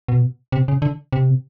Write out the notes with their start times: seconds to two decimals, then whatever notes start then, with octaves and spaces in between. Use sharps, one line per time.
0.08 B2
0.52 C3
0.68 C#3
0.82 D3
1.13 C3